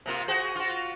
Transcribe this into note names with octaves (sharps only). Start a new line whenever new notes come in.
C3 A#3 F4
F#4 G#4 C5
F4 F#4